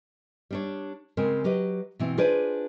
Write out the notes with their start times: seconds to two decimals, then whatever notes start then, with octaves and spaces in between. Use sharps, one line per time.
0.51 G3 D4 C#5
1.17 C#3 G#3 C4 A#4
1.44 F#3 G4 B4 D#5
1.99 B2 E3 C4
2.18 D4 F4 G#4 B4 C5 D5